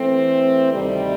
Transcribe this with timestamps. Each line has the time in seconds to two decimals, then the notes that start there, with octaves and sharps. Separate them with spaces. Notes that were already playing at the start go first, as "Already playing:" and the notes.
Already playing: E3 A3 C4
0.72 D2 C3 D#3 G3